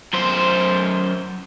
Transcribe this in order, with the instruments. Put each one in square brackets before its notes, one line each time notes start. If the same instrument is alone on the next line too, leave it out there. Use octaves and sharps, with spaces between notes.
[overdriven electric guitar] F#2 C5